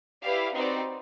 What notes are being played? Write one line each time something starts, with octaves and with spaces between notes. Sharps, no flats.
E4 G4 B4 D5 F5
C4 D#4 F#4 B4 D5